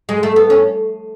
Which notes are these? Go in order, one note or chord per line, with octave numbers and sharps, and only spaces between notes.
G#3
A3
B3
C#4